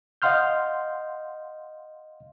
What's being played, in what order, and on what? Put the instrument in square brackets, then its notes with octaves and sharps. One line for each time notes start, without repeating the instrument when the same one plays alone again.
[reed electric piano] D#5 F5 F#5 C6 F6 G6